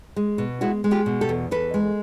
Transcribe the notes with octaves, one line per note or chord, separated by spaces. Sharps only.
G#3
B2
G#3 E4 F#4
G#3
F4 G4
B2
G4 A4
E2
E2 A4 B4
G#3